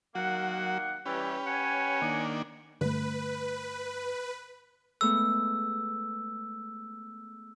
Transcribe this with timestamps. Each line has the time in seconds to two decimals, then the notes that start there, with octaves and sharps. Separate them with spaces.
0.15 D#3 F#3 A#3 F#4 F#5
1.06 E3 G3 C#4 G4 B4
1.47 C#5 F#5 G#5
2.02 D#3 A#3 D4
2.81 G2 D3 A3 B4
5.01 G#3 A3 B3 E6